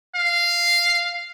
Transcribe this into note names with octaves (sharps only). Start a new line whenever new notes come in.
F5